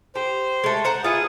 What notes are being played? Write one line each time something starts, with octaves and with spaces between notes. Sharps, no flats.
G4 C5
G#3 A3
C5 F#5 A#5
B3 E4 F4 G#4